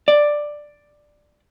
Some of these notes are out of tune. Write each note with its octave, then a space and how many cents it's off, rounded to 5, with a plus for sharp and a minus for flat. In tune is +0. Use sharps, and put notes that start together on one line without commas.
D5 +10